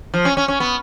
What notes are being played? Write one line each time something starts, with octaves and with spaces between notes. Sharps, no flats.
F3
C#4
C#4
C#4
B3